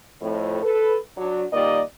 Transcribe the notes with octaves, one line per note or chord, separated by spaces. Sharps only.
F2 A2
A4 B4
F#3 D4
A#2 D#3 G3 A#3 D5 D#5